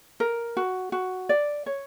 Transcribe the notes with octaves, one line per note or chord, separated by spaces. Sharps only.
A#4
F#4
F#4
D5
C#5